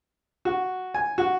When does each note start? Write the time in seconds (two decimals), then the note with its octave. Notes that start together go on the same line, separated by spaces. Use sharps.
0.45 F#4
0.94 G#5
1.18 F#4